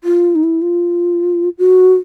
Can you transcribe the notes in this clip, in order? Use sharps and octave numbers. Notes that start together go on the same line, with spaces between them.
F4
D#4
E4
F4
F#4